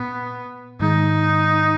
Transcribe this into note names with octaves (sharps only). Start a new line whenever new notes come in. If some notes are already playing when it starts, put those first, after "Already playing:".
Already playing: A#2 B3
G#2 D#3 G#3 D#4